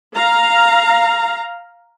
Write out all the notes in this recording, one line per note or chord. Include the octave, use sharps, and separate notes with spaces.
F5 A#5